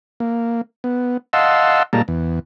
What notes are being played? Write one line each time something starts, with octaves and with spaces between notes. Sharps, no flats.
A#3
B3
D#5 F5 F#5 A5 C6 E6
A#2 G3 G#3 A#3 A5 A#5
E2